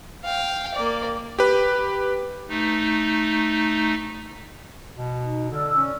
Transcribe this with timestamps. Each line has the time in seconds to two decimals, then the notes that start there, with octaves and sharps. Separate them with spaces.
0.25 F5 G5
0.75 A#3 D5
1.39 G4 B4
2.49 A3 D#4
4.97 B2
5.24 D#4
5.52 D3 D5 E6 F6
5.76 C#4